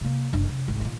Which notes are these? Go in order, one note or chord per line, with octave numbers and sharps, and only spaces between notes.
C3 A#3
F#1 D4
C3
G#1 D2
A#2 D#3